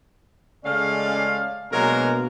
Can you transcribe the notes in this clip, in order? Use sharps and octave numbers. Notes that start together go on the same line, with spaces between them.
C#3 G#3 A3 C#4 D5 F5
B2 F#3 G#3 A#3 D4 A#4